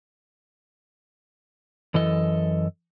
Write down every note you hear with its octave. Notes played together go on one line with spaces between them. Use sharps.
F#2 E3 A4 D#5